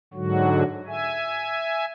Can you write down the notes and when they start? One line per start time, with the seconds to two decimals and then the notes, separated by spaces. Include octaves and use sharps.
0.14 G#2 D3 F#3 F#4
0.87 E5 G#5